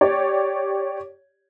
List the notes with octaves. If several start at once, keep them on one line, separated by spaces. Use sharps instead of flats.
G4 C#5 D5